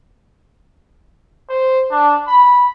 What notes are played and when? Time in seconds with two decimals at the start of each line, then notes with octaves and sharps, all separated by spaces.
1.49 C5
1.91 D4
2.28 B5